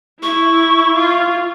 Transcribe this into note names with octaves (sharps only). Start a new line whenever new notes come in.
E4 C#6
F4